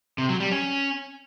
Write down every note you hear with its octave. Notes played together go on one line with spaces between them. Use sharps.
C3
F#3
G3
C#4